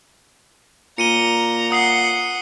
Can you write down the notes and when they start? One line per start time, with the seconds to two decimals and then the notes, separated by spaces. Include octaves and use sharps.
0.98 A#2 A#5 C#7 D#7 G7
1.72 F#5 D#6 C7 G7